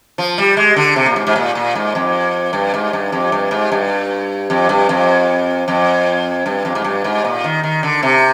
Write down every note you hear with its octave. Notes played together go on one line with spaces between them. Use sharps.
F3
G3
G#3
D3
C3
A#2
G#2
G#2
A#2
A#2
G#2
F2
G2
G#2
G2
F2
G2
G#2
G2
F2
G2
F2
F2
G2
F2
G#2
G2
G#2
A#2
D#3
D#3
D3
C3